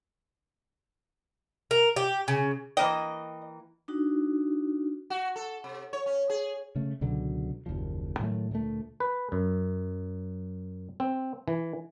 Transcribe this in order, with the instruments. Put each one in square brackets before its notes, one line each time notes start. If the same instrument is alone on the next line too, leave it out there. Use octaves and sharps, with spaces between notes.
[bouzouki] A#4
G4
C#3
[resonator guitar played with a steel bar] E3 A#3 G5 [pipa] D#5
[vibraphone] D4 D#4 F#4
[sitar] F#4
A4
C3
C#5
C#4
G#4
[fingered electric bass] C#3 A3
C#2 B2 D3 F#3
F#1 D#2 A#2 F3
A2 D#3 F#3 A3
D2 A#2 G3 A3
[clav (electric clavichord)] B4
F#2
C4
E3